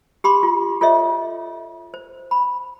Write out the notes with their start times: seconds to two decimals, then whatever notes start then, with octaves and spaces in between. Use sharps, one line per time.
0.24 G4 B5 C6 D6
0.43 F4
0.81 F4 A4 C#5 D#5 E5
1.94 C5
2.31 B5